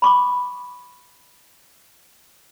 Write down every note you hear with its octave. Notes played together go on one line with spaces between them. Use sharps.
B5 C#6 D6